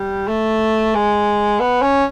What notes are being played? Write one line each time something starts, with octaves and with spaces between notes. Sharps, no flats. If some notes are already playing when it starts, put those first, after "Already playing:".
Already playing: G3
A3
G#3
B3
C#4